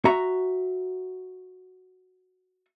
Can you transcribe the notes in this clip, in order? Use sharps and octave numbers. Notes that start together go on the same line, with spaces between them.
F#4 E5 A#5